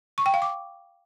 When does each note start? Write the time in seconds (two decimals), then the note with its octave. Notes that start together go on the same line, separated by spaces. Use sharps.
0.18 C#6
0.26 G5
0.34 F5
0.42 D6